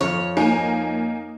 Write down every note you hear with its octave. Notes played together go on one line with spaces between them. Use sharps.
F2 C#5 F6
A#3 D#4 G#5